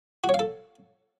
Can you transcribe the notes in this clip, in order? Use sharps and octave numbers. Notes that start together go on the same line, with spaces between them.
F#4
C#5
F5
A4